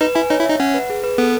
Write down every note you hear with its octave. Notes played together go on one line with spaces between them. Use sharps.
D#4 B4
E4 G#5
D#4 C#5
E4
D#4 E5
C#4 F#5
B4
G#4
B4
B3 A4